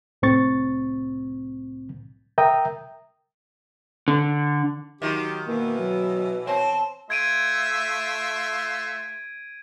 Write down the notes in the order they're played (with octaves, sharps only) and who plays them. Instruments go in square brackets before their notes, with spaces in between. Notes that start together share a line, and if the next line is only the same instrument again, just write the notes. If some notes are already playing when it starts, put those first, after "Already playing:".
[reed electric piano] C2 A2 C4 C#6 A6
A#4 E5 G5 A#5 D#6
[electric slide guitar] D3
[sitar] D#3 F4 [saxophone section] F#3 G4
[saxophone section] B2 E3 [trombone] A#3
[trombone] F#3
[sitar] C4 [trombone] C#5 [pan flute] A5
[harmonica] A3 F4 E5 [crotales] G#6 D7 D#7